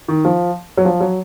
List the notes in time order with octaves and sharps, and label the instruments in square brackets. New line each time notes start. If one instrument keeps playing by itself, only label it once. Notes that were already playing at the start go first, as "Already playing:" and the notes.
[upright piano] D#3
F3
F#3
F3
F#3